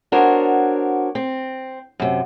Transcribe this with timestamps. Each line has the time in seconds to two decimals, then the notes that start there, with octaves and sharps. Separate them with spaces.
0.12 B3 D4 F#4 A#4 C5 C#5
1.15 C4
2.00 F#2 C3